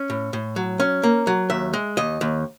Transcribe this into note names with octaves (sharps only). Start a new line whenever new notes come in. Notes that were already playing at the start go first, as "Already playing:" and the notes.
Already playing: C#4
A2
A2
F#3
C#4
A#3
F#3
D#2 E5
G#3
D#2 D#5
D#2